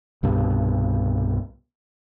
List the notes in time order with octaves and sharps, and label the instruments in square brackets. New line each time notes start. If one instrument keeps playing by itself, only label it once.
[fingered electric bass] C2 G2 B2